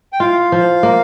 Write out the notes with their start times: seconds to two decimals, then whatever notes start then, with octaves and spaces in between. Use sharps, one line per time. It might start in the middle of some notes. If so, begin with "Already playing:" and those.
0.13 G5
0.20 F4 F5
0.52 F3
0.83 A#3